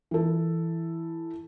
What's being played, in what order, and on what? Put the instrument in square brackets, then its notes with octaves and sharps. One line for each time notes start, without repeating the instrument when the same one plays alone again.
[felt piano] E3 A4